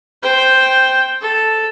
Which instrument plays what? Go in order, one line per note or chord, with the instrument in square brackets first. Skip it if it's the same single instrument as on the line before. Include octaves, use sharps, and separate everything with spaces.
[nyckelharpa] C5 G5
A4